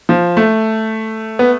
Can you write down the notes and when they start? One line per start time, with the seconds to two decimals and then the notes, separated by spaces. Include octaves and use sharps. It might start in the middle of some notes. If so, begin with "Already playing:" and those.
0.09 F3
0.37 A3
1.39 B3